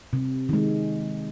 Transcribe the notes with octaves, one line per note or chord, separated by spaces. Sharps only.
C3
D#3 G#3